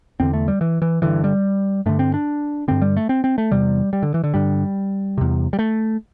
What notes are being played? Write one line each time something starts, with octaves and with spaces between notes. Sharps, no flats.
E2 D3 C4
A3
G3
E3
E3
G2 D3 E3
G3
G2 D3 A3
C4
D4
G2 D3 C4
G3
A3
C4
C4
A3
E2 C3 G3
G3
D3
E3
D3
G2 D3 G3
E2 C3
G3
A3